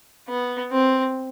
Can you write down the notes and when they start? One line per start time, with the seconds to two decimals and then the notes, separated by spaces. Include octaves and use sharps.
0.29 B3
0.72 C4